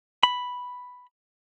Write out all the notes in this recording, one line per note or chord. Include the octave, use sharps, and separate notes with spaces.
B5